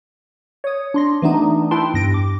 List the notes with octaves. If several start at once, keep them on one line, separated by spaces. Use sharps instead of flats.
C#5 D#6
D4 C6 A#6
E3 G3 A3 B3 D4 D#4
E4 B4 G5 A5 C6
E2 G2 A#6 D7
D6